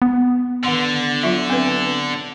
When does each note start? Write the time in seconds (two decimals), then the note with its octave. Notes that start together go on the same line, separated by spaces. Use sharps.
0.02 B3
0.64 D3 D#3 F#5 C6
1.23 F#3 F4 E5
1.50 C4 B4